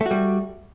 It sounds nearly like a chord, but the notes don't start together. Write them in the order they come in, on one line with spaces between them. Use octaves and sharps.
A3 F#4 G3